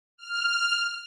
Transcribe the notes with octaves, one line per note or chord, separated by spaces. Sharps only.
F6